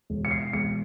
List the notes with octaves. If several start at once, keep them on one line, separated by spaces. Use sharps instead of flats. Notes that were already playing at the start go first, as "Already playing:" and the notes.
E1
C#7
C7
E1 C#7